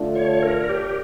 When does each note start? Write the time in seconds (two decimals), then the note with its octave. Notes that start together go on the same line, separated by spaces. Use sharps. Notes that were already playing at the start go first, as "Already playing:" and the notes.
Already playing: D3 A3 D4 F4
0.15 C#5
0.43 A#4
0.69 G4